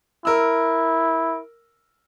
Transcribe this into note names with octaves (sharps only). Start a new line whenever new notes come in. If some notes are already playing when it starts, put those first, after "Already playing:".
E4 A#4 E6